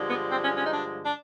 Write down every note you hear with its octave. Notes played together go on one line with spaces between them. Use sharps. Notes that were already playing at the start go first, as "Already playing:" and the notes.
Already playing: G2 D3 F3 G#3
B3
C4
C#4
C#4
D#4
D4
D4